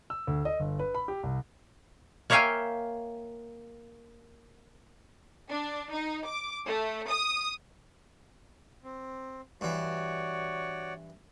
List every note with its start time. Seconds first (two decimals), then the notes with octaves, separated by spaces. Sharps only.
0.10 E6
0.27 D2
0.45 D#5
0.60 G1
0.79 B4
0.95 B5
1.08 G4
1.23 C2
2.30 A#3 C#5 E5 F5 G5 G#5
5.49 D4
5.91 D#4
6.26 D6
6.65 A3
7.08 D#6
8.83 C4
9.61 G2 E3 F#4 C#5 D5